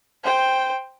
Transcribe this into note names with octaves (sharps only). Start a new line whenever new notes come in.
C5 G5